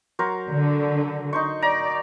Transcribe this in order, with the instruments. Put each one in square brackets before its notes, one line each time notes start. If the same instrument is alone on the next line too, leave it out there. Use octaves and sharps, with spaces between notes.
[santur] F#3 A#4 C5
[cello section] D3
[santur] D#4 C5 C#6
[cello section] D5 [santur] A#5